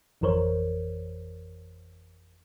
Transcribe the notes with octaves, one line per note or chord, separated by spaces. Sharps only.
G#1 F2 E3 A#4 C5 C#5